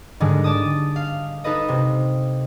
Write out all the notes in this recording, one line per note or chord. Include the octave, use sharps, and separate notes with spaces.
G#2 D3 D#3 G3 G#3
D5 A5 D#6
F5
D#4 A4 B4 D#5
C3